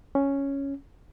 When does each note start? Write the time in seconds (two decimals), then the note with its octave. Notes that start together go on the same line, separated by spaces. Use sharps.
0.15 C#4